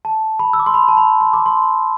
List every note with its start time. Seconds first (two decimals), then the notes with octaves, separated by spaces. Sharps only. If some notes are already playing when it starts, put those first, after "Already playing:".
0.05 A5
0.39 B5
0.53 E6
0.59 D6
0.66 C6
0.74 B5
0.88 A5
0.97 B5
1.21 C6
1.33 D6
1.46 C6